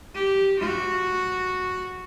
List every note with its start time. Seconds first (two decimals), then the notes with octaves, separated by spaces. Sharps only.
0.14 G4
0.59 F#4